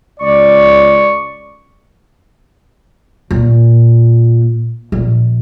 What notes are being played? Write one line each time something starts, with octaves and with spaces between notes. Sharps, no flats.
C#2 D5 C#6
A#2
A#1